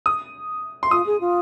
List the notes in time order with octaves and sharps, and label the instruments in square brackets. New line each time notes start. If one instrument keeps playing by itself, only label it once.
[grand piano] D#6
C6
[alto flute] F4 [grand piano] D#6
[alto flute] G#4
F4